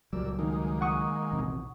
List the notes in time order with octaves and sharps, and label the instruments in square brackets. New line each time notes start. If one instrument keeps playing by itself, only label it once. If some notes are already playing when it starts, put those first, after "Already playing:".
[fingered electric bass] C#2 F#3 G3 [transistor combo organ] A#2 D5 E6
[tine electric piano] D#3 [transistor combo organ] G#3 A#3 D#4
[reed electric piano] F#5 C#6 D#6
[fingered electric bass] A#1 E2 C3